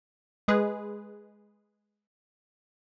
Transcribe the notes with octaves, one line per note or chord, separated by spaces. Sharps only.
G#3 G#4 B4